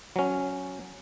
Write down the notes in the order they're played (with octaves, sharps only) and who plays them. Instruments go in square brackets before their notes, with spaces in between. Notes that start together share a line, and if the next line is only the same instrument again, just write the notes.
[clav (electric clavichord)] F#3 C#4